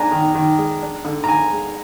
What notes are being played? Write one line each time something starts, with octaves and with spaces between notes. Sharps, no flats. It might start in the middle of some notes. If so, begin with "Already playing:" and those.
Already playing: G#3 D4 G#5 A#5
D#3
D#3
G#3
D4
D3
A#5
D3 G#5
G#3